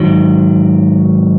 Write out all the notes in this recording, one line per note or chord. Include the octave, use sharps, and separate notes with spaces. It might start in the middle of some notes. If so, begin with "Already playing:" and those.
Already playing: G#2 D#3 F#3